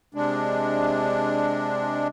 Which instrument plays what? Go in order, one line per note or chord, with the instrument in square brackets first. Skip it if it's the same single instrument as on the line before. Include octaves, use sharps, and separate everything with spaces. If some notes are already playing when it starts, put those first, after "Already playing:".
[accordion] C3 G#3 D4